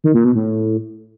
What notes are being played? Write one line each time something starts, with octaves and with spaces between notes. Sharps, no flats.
D#3
A#2
B2
A2